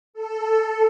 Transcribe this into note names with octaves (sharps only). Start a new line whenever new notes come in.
A4